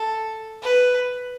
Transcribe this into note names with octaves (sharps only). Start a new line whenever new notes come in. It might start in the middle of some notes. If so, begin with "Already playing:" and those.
Already playing: A4
B4